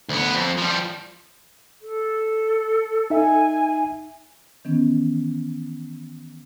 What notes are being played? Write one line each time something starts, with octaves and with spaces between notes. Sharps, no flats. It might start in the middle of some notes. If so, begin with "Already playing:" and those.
D2 B3
F2
F3 G3
A4
D#4 E5 G#5
D#3 E3 B3 C#4